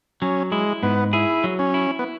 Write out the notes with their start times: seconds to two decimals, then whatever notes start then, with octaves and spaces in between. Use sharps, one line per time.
0.22 F#3 C#4
0.52 G#3 E4
0.83 G#2 B3
1.13 E4 G#4
1.44 F#3
1.59 C#4
1.74 E4
1.99 B3